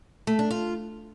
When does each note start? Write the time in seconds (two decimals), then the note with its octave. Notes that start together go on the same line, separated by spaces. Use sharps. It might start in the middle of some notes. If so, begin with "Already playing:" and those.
0.27 A3
0.39 D4
0.51 F4